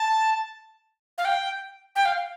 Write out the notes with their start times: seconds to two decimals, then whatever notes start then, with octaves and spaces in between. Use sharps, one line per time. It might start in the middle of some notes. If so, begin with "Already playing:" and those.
Already playing: A5
1.18 F5
1.25 G5
1.96 G5
2.05 F5